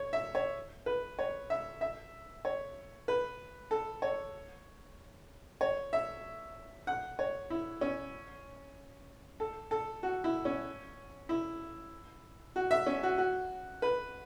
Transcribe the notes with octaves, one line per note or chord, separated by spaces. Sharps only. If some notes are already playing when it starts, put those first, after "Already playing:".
Already playing: C#5
E5
C#5
B4
C#5
E5
E5
C#5
B4
A4
C#5
C#5
E5
F#5
C#5
E4
C#4
A4
A4
F#4
E4
C#4
E4
F#4
E5
C#4
F#4
F#4
B4